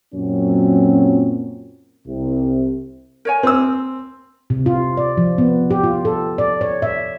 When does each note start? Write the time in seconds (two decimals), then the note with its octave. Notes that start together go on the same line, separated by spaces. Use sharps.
0.14 F#2 A#2 F#3 C4 C#4
2.06 C2 C3
3.25 A#4 C#5 G#5
3.43 C4 E6
4.50 C3
4.66 F4
4.97 D5
5.17 F3
5.38 B3
5.71 G4
5.84 F4
6.05 A4
6.38 D5
6.61 C#5
6.82 E5